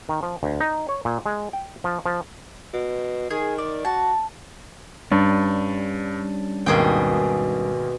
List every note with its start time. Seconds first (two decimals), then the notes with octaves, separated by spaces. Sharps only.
0.09 D#3
0.23 F3
0.43 D2
0.61 D#4
0.89 C#5
1.05 A#2
1.26 G#3
1.53 G5
1.84 F3
2.06 F3
2.74 B2
3.30 D#3 G#4
3.58 D5
3.85 F#4 A5
5.12 G2 G3 C#4 D4
6.66 G#1 D#2 B2 G#4 A#4 G5